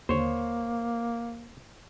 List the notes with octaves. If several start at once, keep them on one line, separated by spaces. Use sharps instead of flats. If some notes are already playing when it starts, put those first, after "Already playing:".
D#2 D3 A#3 C5 C#5